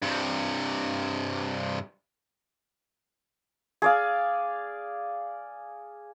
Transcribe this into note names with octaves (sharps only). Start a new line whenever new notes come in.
G2 C3
G#4 D5 F5